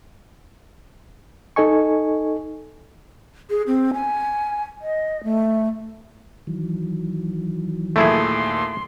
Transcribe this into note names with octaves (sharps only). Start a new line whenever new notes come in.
D#4 A4 D#5 G#5 C#6
G#4
C4
G#5
D#5
A3
D#3 E3 F#3
D#2 A#2 A3 E4 G#4 C6